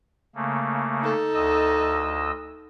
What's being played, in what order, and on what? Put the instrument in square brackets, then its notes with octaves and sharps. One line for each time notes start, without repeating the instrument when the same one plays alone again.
[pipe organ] C#3 A3 A#3
[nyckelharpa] D#4 A4
[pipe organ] D2 D#5 E6